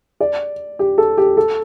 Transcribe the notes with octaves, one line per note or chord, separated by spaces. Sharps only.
D5
G4
A4
G4
A4